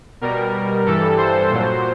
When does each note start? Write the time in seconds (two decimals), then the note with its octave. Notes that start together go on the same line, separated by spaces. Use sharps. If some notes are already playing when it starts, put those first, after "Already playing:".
0.21 B2 G3 A#4
0.86 G2 E3 G3 A4
1.18 C5
1.50 A#2 F#3